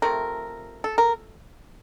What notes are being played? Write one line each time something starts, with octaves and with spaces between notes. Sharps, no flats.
C3 F3 A3 A#4
A4
A#4